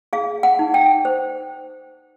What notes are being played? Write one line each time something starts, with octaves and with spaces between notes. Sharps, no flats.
G#4 F5
F#5
D#4
G5
C5